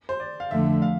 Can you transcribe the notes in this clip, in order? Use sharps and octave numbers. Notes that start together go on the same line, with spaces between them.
C5
D5
F5
F2 D3 F3 A3 E5
F5